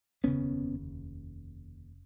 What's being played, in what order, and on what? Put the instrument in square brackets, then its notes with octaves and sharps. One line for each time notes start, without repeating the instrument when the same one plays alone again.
[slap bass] F1 D#2 C#3 B3 C#4